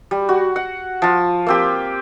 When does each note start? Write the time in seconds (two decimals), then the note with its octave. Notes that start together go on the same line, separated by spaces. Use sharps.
0.11 G3
0.29 F#4
0.56 F#5
1.02 F3 F4
1.46 A#3 C4 G4